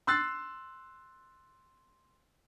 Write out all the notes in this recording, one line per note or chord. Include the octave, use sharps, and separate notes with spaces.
C6 E6 F#6 A6 C7